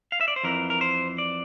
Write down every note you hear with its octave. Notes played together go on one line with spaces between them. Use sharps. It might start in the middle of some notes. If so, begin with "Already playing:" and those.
F5
E5
D5
C5
F2 E3 A#4
A#4
C5
D5